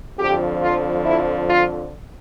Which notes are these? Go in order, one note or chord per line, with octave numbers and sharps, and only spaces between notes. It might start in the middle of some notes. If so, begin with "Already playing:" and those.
F2 D3 F3 G4
F4
E4
F4